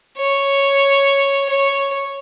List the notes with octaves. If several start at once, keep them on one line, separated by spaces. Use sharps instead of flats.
C#5
C#5